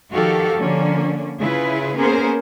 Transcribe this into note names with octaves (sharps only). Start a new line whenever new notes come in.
D#3 F3 F#4 G4 A4 F5
D3 F3 A#3 C#4 D4
C#3 E4 F4 G#4 B4
A#3 B3 C#4 G#4 A#4 C5